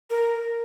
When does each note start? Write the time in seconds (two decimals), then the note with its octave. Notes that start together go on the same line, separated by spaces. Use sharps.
0.10 A#4